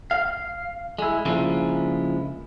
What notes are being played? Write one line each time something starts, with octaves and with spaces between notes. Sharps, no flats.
F5
G#3 E4
C#3 F3 G#3 A#3 D4 E4